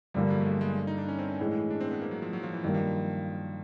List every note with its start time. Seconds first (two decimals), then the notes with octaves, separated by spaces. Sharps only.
0.14 G2 D3 F3 G3 A#3
0.30 F#3
0.41 A3
0.45 G#3
0.61 G#3
0.87 D#4
0.98 D4
1.08 C#4
1.19 C4
1.29 C#4
1.39 A2 E3 G#3
1.70 D4
1.81 C4
1.91 B3
2.01 A#3
2.11 F#3
2.22 F3
2.33 F#3
2.43 F3
2.53 E3
2.63 G2 D#3 F#3 G3 A#3
2.74 F3